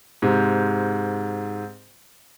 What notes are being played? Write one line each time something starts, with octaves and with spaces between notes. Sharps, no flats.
G#2 C3